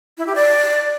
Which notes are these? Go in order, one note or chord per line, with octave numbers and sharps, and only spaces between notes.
E4
G4
D5